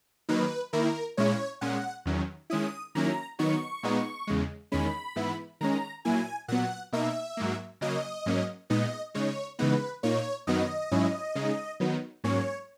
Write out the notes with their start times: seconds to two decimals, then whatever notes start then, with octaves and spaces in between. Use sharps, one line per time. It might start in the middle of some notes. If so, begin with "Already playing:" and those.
0.29 D#3 F#3 A#3 D#4 B4
0.73 D#3 A#3 E4 A#4
1.17 A#2 G#3 C#4 E4 C#5
1.61 A#2 G#3 C#4 F#5
2.06 E2 D#3 F#3 C#4
2.50 D#3 G#3 C#4 E4 D#6
2.95 D#3 F#3 A#3 C#4 E4 A#5
3.39 D#3 F#3 B3 D#4 C#6
3.83 A#2 G#3 B3 D#4
4.27 E2 C#3 G#3
4.72 E2 D#3 G#3 C#4 B5
5.16 G#2 E3 B3 E4
5.61 D#3 G#3 C#4 A#5
6.05 A#2 F#3 A#3 E4 G#5
6.48 A#2 F#3 B3 F#5
6.92 B2 A#3 D#4 E5
7.37 G#2 F#3 A#3
7.81 C#3 F#3 A#3 D#5
8.26 G#2 F#3 A#3 C#4
8.70 A#2 G#3 B3 D#4 D#5
9.14 C#3 G#3 D#4 C#5
9.59 C#3 E3 G#3 B3 D#4 B4
10.03 A#2 A#3 D#4 C#5
10.47 F#2 D#3 F#3 B3 D#4 D#5
10.91 G#2 F#3 C#4 E4
11.35 C#3 G#3 D#4
11.80 D#3 F#3 B3 D#4
12.24 G#2 F#3 A#3 C#4 C#5